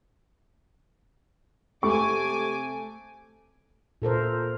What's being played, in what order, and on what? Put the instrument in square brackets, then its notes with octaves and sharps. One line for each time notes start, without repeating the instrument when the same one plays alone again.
[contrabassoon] C3 [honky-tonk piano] A3 [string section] G#5 D6 [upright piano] C#6
[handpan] A#2 A4 A#4 C5